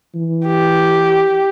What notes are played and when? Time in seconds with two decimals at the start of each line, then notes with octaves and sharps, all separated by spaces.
0.15 E3
0.47 G4